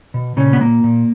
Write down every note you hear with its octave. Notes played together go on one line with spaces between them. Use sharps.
B2
A#2 C#3 C#4
B3
A#2 A#3
A#2